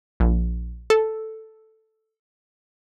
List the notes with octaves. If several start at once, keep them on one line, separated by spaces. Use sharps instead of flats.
A#1
A4